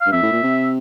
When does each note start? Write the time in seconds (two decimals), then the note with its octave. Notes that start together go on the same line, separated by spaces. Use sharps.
0.01 F5
0.06 G2
0.12 F2 E5
0.22 A2
0.32 A#2
0.43 C3